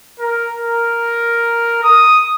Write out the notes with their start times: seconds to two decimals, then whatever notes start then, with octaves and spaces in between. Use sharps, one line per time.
0.19 A#4
0.54 A#4
1.84 D#6